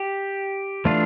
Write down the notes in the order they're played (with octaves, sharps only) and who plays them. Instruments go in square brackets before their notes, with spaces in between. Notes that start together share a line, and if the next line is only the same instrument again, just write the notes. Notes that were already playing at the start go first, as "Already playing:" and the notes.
Already playing: [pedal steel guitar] G4
E3 A3 D4 F4